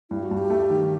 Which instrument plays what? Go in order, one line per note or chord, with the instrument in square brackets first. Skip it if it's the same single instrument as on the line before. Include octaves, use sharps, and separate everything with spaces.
[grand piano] G2 [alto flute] E4
[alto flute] F#4
[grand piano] G2
[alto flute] G4
[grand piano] A3
D#3